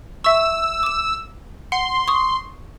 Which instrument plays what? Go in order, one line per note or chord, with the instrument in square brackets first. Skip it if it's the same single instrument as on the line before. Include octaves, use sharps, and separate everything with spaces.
[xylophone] E5 C#6 [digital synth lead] E6
[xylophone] D6 E7
[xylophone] F#5 [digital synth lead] C6
[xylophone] C#6 D#6